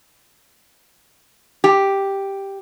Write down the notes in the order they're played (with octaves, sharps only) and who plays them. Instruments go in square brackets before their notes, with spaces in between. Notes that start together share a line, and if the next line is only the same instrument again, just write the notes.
[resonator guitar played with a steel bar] G4